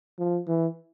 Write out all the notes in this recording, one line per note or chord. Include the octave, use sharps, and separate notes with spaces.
F3
E3